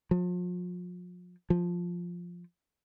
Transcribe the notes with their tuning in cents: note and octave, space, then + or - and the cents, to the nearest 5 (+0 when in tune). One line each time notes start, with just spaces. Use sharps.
F3 +40
F3 +5